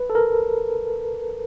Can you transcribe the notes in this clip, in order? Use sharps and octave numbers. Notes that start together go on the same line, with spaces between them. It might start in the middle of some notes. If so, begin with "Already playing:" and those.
Already playing: B4
A4
A#4